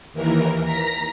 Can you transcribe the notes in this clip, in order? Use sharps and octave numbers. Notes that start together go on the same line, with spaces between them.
D#2 E3 A#4
A#5 A#6 B6